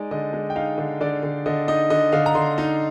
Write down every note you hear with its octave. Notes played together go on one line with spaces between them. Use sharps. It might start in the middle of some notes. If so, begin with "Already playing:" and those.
Already playing: G#3 D#4 D5
D3 D#5
G#3
G5
D#4 F5
D3
D3 D5
D3
D3 D#5
D#4 D#5
D3 D#5
D3 F5
A#5
D3 C6
D#4